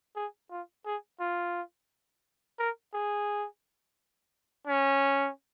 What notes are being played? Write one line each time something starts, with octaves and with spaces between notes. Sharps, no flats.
G#4
F4
G#4
F4
A#4
G#4
C#4